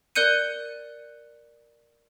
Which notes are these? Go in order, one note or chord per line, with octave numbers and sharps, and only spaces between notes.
A#4 D5 F#6 G6 C#7 D#7